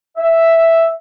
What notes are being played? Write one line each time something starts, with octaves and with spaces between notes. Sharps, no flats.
E5